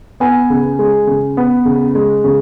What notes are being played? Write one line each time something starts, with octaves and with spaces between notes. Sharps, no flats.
B3 G#5
C#3
G#3
C#3
B3
C#3
G#3
C#3